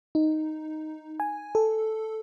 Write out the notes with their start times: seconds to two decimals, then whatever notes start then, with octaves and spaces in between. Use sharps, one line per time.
0.15 D#4
1.20 G#5
1.55 A4